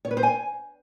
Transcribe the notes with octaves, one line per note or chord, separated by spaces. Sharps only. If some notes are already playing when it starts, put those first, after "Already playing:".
C#5
B4
C5
G#5